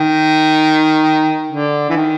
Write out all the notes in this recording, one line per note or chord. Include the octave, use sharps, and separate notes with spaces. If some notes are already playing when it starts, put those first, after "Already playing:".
Already playing: D#3
D3
E3
D#3